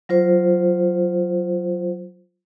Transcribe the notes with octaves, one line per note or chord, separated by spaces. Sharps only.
F#3 F4 C5